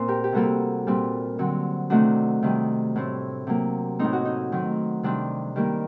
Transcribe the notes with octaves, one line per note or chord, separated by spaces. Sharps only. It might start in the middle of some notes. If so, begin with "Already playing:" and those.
Already playing: A#2 C4 C5
G4 A#4
G4
C3 G3 A#3 F#4 A4
A#2 G3 C4
D3 F#3 C4
C3 D#3 A3 C4 D4 F#4
C3 D#3 G3
A2 A3 C4
C3 F#3 A#3
A2 A3 C4 D#4
F#4
D#4
D#3 F#3 C4
C3 D#3 G3 C4 D4
D#3 G3 A#3